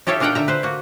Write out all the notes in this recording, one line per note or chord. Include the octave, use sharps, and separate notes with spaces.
D#4 G4 A4 C#5 E5 F5
A#2 D4 D#4 A#4 F#5 G5
D3 E5 A#5
B4 C5
A#3 F#4